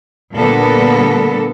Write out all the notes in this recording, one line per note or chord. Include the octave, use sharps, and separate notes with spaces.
A#2 D3 G3 B3 A4 A#4